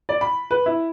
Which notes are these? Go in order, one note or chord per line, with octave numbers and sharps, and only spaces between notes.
D5
B5
B4
E4